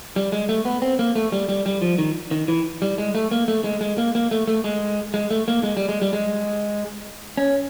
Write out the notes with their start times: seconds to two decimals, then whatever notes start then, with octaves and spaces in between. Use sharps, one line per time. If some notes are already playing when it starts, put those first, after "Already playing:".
0.16 G3
0.32 G#3
0.49 A3
0.65 B3
0.82 C4
0.99 A#3
1.15 A3
1.32 G3
1.49 G3
1.66 G3
1.82 F3
1.98 D#3
2.31 D#3
2.48 E3
2.82 G3
2.98 G#3
3.15 A3
3.31 A#3
3.48 A3
3.64 G#3
3.81 G#3
3.98 A#3
4.15 A#3
4.31 A3
4.47 A3
4.64 G#3
5.14 G#3
5.31 A3
5.48 A#3
5.63 G#3
5.77 G3
5.89 G#3
6.02 G3
6.13 G#3
7.37 C#4